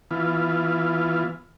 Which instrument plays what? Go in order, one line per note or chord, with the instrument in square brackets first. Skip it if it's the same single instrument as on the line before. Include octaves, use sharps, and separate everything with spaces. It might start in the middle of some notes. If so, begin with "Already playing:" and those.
[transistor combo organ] E3 B3 F4